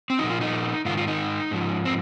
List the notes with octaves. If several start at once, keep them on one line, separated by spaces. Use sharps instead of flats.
C4
A#2 F3 D#4
F4
D#4
G#2 D#3 F4
F4
D#4
G#2 F3
C4